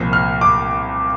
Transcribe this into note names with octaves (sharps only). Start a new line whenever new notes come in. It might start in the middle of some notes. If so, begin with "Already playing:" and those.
Already playing: C2 A#2 F3
F6
D6